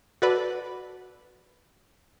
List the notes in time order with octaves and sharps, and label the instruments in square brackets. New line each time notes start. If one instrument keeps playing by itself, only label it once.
[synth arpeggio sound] F#4 A4 B4 D5 B5